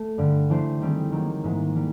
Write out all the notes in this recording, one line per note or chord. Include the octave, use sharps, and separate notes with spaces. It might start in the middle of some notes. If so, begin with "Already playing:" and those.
Already playing: A3
G2 D3 G3
E3 A3 D4 G4 C5
D#3 G3 C4 D#4 G#4
D#3 F#3 A#3
G#2 E3 G#3
E3 G3 A#3